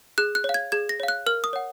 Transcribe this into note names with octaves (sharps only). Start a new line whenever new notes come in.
G#4 F#6
F#6
C#5
F5
G#6
G#4 G#6
A#6
C#5 F5
F#6
A#4 F6
D#6
C#5 F#5